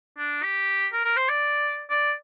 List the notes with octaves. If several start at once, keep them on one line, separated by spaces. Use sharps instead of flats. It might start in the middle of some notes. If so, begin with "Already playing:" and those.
D4
G4
A#4
A#4
C5
D5
D5